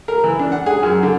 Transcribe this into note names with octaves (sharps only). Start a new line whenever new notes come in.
A#4
E3
D4
F#5
G#4
F#2
D3